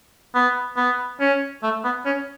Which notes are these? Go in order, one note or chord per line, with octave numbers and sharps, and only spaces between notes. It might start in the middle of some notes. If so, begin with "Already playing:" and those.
B3
B3
C#4
A3
B3
C#4